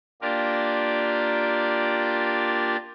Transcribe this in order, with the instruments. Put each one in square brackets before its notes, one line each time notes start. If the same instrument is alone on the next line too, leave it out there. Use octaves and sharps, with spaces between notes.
[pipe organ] A#3 D4 F4 G4 A#4 D5